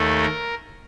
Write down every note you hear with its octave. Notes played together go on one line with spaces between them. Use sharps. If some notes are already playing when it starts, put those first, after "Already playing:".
Already playing: D#2 D#3 A3 A4
A#4